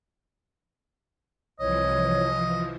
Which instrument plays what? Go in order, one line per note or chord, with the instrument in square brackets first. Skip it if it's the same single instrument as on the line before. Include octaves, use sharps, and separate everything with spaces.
[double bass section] C2 [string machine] E3 F3 [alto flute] C#5 [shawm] D#5